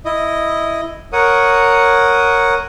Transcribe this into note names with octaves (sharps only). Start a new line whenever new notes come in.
E4 D#5
A#4 C#5 F#5 D#6